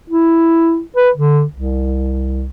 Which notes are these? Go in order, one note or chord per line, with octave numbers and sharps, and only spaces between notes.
E4
B4
D3
C2